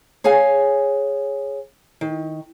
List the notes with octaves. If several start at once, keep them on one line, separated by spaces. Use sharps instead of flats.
G#4 C#5 F5 G#5
D#3